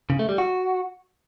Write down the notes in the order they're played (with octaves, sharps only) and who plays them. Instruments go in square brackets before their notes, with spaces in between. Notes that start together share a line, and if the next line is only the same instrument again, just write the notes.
[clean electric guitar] C#3
A3
G3
F#4